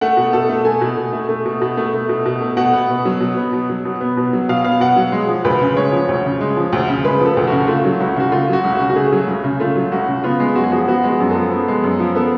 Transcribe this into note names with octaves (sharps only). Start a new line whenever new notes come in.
A3 F#5
B2
B2 A4
A3
A3 G#5
B2
B2
A3
A3
B2
B2
A3
A3
B2
B2
A3
B2 F#5
B3
B2
F#3
B2
B3
B2
F#3
B2
B3
B2
F#3
B2 F5
B3 F5
B2 F#5
F#3
G#3
F3
D2 B4
C#3
G#3 C#5
F3
D2
C#3
G#3
F3
D2
C#3
G#3 B4
F3
A4
D2
C#3 F#4
A3 F4
F#3
C#2 F#4
C#3 F#4
A3 F4
F#3
F#4
C#2
C#3 F#4
F#4
A3 G#4
F#3
C#2
C#3
A3 F4
F#3
C#2 F#4
C#3
B3 F4
G#3
F#2 F#4
G#4
F3 F#4
B3 F#4
G#3
F#4
F#2
F3 A4
B3
G#3
F#2
F3
B3 A4